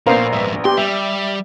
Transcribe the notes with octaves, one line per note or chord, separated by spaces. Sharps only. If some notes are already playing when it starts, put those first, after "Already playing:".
A#1 A#2 B3 A#4 C5 F5 A#5
F2 G#2 E5
G4 C6
G3 E5